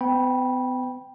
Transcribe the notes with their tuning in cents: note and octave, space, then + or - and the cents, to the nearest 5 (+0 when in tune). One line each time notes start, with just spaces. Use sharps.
B3 +40 G5 +0 B5 -20